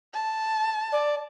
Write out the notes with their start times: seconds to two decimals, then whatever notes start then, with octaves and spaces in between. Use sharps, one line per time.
0.13 A5
0.92 D5